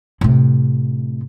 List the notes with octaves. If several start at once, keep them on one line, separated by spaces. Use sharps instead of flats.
A2 C3